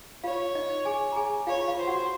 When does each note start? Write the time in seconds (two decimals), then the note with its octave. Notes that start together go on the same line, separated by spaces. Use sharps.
0.24 F4 C#5 F5
0.55 D#4 D#5
0.85 G#4 G#5
1.12 A#5
1.16 G#4 G#5
1.47 F4 C#5 F5
1.67 F4 F5
1.78 C5
1.88 F#4 F#5